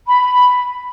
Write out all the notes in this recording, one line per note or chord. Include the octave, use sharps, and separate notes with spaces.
B5